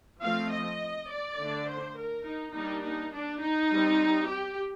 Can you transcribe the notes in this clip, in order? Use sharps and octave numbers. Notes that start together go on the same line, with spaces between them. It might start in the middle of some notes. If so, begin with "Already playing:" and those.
F3 A3 C4 F5
D#5
D5
D3 A3 D4
C5
A#4
D#4
G3 A#3 D4 D#4
D#4
D4
D#4
G3 C4
G4